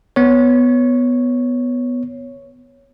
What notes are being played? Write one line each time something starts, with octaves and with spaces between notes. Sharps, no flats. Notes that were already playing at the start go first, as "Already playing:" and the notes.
B3 C#5